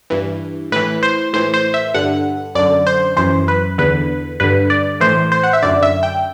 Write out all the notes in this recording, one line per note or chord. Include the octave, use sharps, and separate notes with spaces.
G2 E3
A2 E3 B4
C5
A2 E3 C5
C5
E5
G2 D3 F#5
F#2 D3 D5
C5
F#2 E3 C5
B4
E2 D3 B4
G2 D3 B4
D5
A2 E3 C5
C5
F#5
E5
F#2 D3 D5
E5
G5